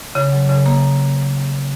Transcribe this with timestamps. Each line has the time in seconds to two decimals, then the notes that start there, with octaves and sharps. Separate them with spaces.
0.15 C#3
0.32 F#3
0.49 C#3
0.66 A#3